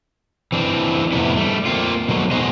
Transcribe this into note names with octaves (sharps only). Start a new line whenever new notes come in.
E3 C4 D4
F2 A2 C3 B3 E4
G3 A3
A#3 C4 F4
B2 F#3 A3
B3 D#4 F#4 G#4 C5 D#5